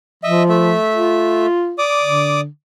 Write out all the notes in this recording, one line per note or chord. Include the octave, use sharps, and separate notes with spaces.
F3 D#5 E5
A3 E5
F4
D5 D6 D#6
D3